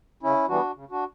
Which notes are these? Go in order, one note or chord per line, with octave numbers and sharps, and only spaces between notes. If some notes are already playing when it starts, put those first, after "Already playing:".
C#3 C#4 E4
E3 G3 B3 D4 F#4
C#3
D4 F#4